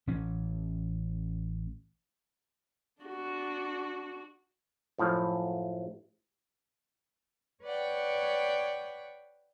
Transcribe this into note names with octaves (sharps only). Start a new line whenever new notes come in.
A1 C#4
D4 F#4
F#2 A2 F3
B4 C#5 D5 F#5 G5